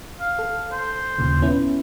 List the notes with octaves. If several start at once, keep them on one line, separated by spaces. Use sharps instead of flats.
F5
A4
C5
D#2 A#2 C#3
B3 C#4 E4